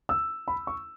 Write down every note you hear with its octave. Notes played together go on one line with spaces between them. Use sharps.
E6
B5
C#6